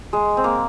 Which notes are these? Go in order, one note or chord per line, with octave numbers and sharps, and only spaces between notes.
G#3
C4
A#3